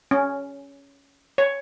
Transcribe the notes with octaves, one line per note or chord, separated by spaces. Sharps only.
C#4
C#5